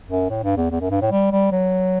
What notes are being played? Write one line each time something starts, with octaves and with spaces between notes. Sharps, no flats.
F#2
A2
G2
E2
E2
F#2
G2
A2
G3
G3
F#3